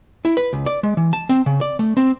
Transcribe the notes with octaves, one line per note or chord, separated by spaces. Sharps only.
E4
B4
C#2
D5
G#3
E3
A5
C4
C#3
D5
A3
C4